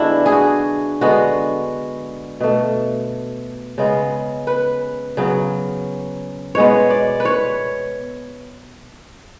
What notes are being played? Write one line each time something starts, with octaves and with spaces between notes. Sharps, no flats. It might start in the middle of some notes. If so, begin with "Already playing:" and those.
Already playing: D3 G#3 B3 D4 E4 F#4
G#4
F#4
D3 G#3 B3 F#4
B2 A3
C#3 G#3 B3
B4
C#3 F#3 B3
B2 G#3 B3 C#5
D5
B4
C#5